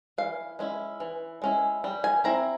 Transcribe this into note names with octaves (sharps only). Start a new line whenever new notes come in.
E3 F5
G#3 C#4 E4
E3
G#3 C#4 E4
G3
G#5
C4 E4 A#5